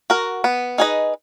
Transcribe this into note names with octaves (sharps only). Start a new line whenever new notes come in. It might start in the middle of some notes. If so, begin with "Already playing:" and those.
F#4 A#4
B3
D#4 G#4 B4 D#5